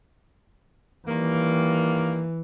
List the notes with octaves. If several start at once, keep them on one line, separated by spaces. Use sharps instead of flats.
D#3 E3 G3 A#3